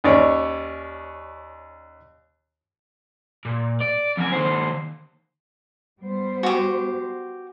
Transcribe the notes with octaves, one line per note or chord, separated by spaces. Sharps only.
D#2 C#4 C#5 D5
A#2
D5
F2 G#5
D#2 C5
G3 B3 C5
F#4 G4